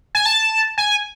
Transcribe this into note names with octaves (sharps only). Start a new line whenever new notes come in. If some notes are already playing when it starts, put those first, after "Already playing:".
G#5
A5
G#5